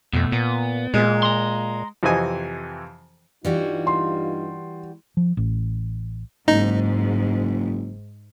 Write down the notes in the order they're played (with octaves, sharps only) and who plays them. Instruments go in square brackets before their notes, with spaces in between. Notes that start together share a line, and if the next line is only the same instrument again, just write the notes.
[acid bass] F2 [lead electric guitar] B2 A3
[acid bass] A#2 [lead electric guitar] B3
[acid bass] A#2 [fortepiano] G#3
[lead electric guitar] A#5 C6
[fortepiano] F2 C3 E3 D#5 G#5
[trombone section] G2 D#4 F4 [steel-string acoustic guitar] E3 G3 F#4
[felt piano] C6
[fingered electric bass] F3
A1
[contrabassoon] F#1 [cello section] G#2 [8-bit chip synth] D#4